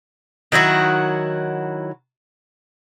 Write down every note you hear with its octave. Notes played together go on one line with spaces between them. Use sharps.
D#3 F#3 E4 F#4